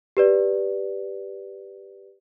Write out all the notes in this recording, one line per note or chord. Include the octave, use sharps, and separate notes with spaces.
G4 B4 D5